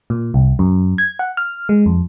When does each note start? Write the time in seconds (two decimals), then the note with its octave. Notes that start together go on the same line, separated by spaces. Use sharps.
0.10 A#2
0.34 C2
0.59 F#2
0.98 G#6
1.19 F#5
1.37 F6
1.69 G#3
1.86 F2